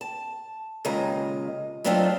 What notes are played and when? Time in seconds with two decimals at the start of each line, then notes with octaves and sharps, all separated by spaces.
0.01 A5
0.85 D#2 A#2 C#3 G#3 D#5 A#5
1.84 F#3 A3 C4 D4 D#4 F4